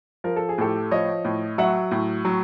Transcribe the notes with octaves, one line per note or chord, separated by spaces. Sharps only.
F3 A#4
A4
G#4
A2 G4 A4
F3 C#5 D#5
A2
F#3 E5 F#5
A2
F#3